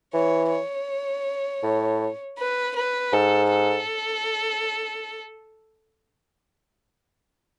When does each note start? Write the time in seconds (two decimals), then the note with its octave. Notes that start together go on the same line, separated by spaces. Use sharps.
0.13 E3 C#5
0.51 C#5
1.63 A2
2.38 B4
2.76 B4
3.13 G#2 A4
3.51 A4